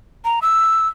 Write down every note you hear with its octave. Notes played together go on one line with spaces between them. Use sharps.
A#5
E6